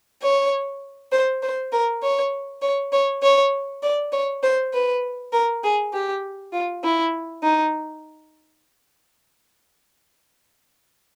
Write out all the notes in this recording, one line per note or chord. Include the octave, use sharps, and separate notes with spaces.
C#5
C5
C5
A#4
C#5
C#5
C#5
C#5
D5
C#5
C5
B4
A#4
G#4
G4
F4
E4
D#4